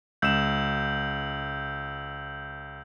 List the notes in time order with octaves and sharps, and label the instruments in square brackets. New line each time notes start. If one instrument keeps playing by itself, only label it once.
[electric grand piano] C#2 E7 [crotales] E6 G6